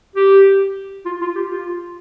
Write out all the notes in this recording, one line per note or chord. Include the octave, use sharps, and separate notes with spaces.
G4
F4
F4
G4
F4